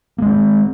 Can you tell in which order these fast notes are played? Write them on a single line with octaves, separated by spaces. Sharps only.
A#3 G#3 C4